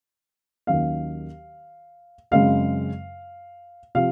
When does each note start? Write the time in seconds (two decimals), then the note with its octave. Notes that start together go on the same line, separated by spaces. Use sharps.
0.67 D#2 D#3 F#3 C#4 F5
2.31 F#2 C#3 G#3 C4 F5
3.95 C3 F3 F5